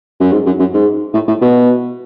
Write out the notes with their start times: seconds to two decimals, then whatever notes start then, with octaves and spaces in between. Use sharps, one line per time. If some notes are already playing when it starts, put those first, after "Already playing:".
0.20 F#2
0.32 G#2
0.46 F#2
0.59 F#2
0.74 G#2
1.14 A2
1.28 A2
1.41 B2